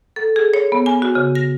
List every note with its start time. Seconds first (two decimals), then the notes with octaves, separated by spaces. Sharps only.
0.16 A4
0.36 G#4
0.54 C#5
0.72 B3
0.86 G#5
1.02 F#4
1.15 C#3
1.35 A#6